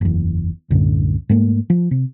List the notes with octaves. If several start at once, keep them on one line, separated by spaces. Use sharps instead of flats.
F#1 E2
C2 F#2 A2 D3
G#2 A3 A#3
F3
C3